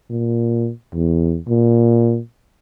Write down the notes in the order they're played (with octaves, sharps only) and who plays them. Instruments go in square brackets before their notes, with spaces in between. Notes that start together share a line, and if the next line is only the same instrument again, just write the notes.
[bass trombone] A#2
E2
A#2